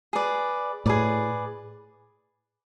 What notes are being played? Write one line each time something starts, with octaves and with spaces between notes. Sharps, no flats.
G#4 B4 D5
A2 G#4 B4 D5